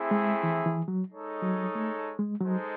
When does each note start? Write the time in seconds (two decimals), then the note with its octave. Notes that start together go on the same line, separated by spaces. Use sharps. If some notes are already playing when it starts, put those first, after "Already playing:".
Already playing: A3 C4 E4 G#4
0.11 G#3
0.43 E3
0.66 E3
0.88 F#3
1.10 G#3 D#4 A4 C#5
1.42 F#3
1.75 A3
2.19 G#3
2.41 F#3 G#3 D#4 A4 C5